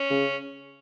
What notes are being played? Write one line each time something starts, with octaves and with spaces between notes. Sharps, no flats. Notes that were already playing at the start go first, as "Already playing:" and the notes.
Already playing: C#4
C#3